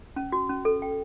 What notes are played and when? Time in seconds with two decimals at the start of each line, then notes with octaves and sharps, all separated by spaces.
0.16 C#4
0.32 F#4
0.49 C#4
0.65 A4
0.82 G5